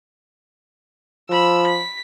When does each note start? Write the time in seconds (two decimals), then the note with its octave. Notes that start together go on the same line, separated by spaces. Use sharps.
1.30 F3 B5 E6
1.67 B6